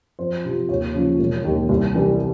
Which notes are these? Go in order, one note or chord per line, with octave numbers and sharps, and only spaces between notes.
F2 C5
C3 F3
D#2 C#5
C#3 F3
E1
D#2 D#3
C2
C3 E3 G3